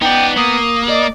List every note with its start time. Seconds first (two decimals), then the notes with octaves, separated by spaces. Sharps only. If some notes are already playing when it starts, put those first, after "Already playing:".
0.02 B3 D#4 D5 G5
0.37 A#3 D#6
0.89 D5 D#5